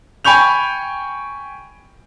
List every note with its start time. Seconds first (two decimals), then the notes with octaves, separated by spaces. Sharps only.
0.25 G5 G#5 B5 C#6 G6 F7